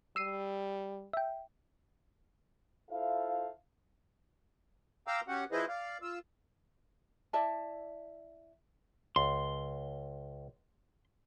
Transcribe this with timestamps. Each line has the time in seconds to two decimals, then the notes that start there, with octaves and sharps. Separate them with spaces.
0.16 G3 E6 C7 D#7
1.13 E5 G5
2.90 E4 F4 A4 C5 E5 F5
5.07 F5 G5 A#5 C6 D6 E6
5.28 C#4 F#4 G4 F#5
5.52 F3 E4 G#4 B4 C5 D#5
5.68 D5 F5
6.02 F4 E6
7.33 E4 D5 E5 A5
9.16 C#2 C6